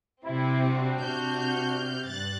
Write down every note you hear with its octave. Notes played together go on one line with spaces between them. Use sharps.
C3 G3 C4 E4
D4 F#4
C3 F6 G6
G2 F#6 A6